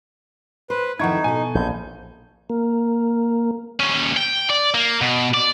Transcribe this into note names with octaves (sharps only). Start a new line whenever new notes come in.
B4 C5
F2 D#3 D#4 E4 F#5 C#6 G#6
B2 A4 G#5
A#1 G6
A#3
D#2 C#4
G5
D5
A#3
B2
D5